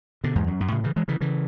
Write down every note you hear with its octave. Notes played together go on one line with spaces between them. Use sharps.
B2 D3
E2 G#2
F#2
F#2
A2 C#3
C#3 E3
E3 G#3
C#3 E3
C#3 E3